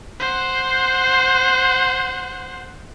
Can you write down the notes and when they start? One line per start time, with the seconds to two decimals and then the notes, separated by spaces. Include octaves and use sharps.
0.20 C5 F#5